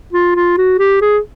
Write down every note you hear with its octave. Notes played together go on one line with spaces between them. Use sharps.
F4
F4
F#4
G4
G#4